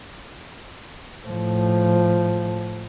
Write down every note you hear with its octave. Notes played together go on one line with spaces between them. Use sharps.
A2 F3